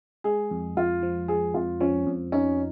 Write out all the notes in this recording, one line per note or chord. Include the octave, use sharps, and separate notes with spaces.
G#3 G#4
F2
F2 F4
F3
F3 G#4
F2 F4
F3 C#4
F2
C#4 D#4